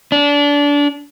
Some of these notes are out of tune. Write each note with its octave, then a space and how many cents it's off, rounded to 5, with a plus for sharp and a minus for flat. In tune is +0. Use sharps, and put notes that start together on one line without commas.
D4 -25